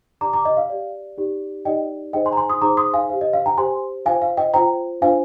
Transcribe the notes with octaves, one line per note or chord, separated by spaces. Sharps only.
G4 D5 A#5 D6
A#5 D6
D#5
F5
G4 D5
D#4 G4 D5
D#4 G4 D5 D#5 G5
D#4 G#4 C5 D#5 G5
G#5 C6
A#5
G#5 C6
C6 D#6
D#4 G#4 C5 A#5 D6
C6 D#6
F5 G#5
G4 C5 F5
D#5
F5
G5 A#5
G4 C5 G#5 C6
F4 C5 F5 G#5
F5
D#5 G5
F4 C5 G5 A#5
D4 F4 C5 F5 G#5